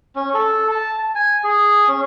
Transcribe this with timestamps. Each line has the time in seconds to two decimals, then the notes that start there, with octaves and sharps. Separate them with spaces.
0.16 C#4
0.34 A4
0.71 A5
1.15 G#5
1.44 G#4
1.88 C#4